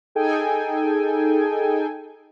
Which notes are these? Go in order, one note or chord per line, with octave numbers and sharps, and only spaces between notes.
D#4 G#4 A4 G5 G#5